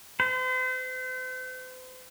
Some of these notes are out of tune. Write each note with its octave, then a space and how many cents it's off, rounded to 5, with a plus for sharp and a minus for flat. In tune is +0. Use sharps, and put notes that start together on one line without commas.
C5 -40